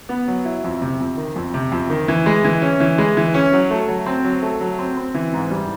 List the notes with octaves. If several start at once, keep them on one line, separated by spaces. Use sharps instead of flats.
B3
F#3
E4
F2
C3
F2
D#3
F2
C3
F2
D#3
E3
G#3
E3
C#4
E3
G#3
E3
C#4
F#3
A3
F#3
C4
F#3
A3
F#3
C4
C4
E3
G#2
G3